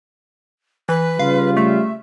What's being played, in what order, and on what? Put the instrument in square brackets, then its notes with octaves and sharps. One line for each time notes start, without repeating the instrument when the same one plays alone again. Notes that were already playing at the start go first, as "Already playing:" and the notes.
[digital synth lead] E3 [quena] B4
[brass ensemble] C#3 G3 F4 [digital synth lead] F5
[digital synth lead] A3 [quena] E5